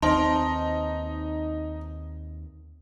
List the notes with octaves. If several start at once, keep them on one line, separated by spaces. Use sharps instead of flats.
D#2 C4 D#4 C5 A5 C6